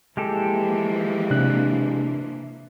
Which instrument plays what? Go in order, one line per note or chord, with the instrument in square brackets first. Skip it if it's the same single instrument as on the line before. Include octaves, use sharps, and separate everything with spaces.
[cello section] E3 F3 A#3 [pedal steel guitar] G#3 G4 A4
[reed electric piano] C3 D4 F#6